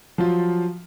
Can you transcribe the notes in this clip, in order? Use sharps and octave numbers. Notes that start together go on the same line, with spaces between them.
F3 F#3 F4